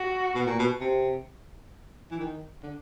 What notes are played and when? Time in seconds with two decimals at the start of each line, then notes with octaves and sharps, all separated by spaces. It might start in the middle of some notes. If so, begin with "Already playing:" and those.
Already playing: F#4
0.35 B2
0.47 A#2
0.59 B2
0.81 C3
2.11 E3
2.20 D#3
2.63 D3